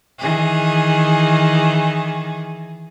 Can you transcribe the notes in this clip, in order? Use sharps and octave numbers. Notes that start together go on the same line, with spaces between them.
D#3 E3 G#4